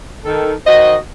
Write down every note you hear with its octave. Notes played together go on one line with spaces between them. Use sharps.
D#3 A4
D#3 F#4 C5 D#5